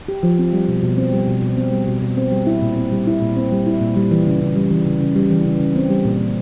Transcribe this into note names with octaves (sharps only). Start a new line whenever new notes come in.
G4
F3
C4
G3
B2
B2
C4
G3
B2
B2
C4
G3
B2
B2
C4
G3
E4
A#2
C4
G3
E4
A#2
C4
G3
E4
A#2
G3
E3
C#3
C#3
G3
E3
C#3
C#3
G3
E3
C#3
C#3
C4
G3
A#2
A#2